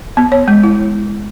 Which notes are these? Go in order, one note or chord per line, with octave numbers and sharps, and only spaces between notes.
B3
C#5
G#3
E4